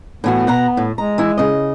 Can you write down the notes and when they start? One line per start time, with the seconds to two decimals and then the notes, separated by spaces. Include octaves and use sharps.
0.24 A2 E3 B3 F#4
0.47 B2 F#5 A#5
0.77 A2
0.98 G#3 A#5
1.18 E3 E4
1.37 C#3 D#5